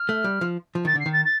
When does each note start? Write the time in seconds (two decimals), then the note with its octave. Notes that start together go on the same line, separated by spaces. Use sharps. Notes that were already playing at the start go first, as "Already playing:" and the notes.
Already playing: F6
0.09 A3
0.24 G3
0.41 F3
0.75 F3
0.85 D#3 A6
0.95 D3 C7
1.06 D#3
1.13 A6
1.25 A6